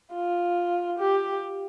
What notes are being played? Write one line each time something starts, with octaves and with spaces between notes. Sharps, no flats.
F4
G4